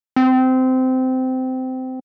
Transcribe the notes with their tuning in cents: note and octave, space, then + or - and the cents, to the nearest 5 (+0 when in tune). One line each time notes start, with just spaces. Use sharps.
C4 -20